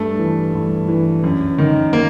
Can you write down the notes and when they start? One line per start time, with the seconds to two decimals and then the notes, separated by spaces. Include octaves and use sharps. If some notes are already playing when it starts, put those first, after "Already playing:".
Already playing: G2 A3
0.19 E3
0.55 G2
0.88 E3
1.24 F#2
1.58 D#3
1.93 A#3